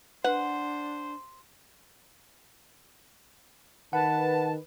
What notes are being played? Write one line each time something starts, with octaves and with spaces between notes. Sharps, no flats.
D4 B4 C5 F#5
D#3 B4 F#5 A5